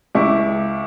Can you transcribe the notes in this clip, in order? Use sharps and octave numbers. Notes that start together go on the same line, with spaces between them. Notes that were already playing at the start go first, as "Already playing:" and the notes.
C#2 E4 C#6 D6